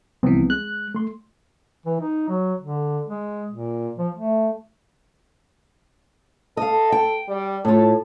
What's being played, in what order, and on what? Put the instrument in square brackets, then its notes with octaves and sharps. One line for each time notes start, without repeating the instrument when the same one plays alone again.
[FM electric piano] C2 E3 [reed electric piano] F3 B3 C4
[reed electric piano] G#3 [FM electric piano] F#6
[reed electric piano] A3 C6
[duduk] E3
D#4
F#3
D3
G#3
A#2
F3
A3
[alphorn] A4 [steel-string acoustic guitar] D#5 F5
[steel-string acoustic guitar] G5
[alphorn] G3
[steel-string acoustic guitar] A2 F4 [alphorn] A4